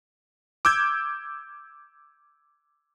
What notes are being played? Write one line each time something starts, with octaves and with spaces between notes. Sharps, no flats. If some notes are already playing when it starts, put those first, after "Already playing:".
D6 E6 G6 G#6